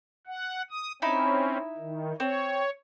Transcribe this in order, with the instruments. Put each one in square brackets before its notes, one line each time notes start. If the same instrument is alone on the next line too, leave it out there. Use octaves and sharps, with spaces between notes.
[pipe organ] F#5
D#6
[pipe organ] C4 C#4 [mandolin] D#4 E4 B5
[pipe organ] D#3
[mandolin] C4 [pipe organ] C#5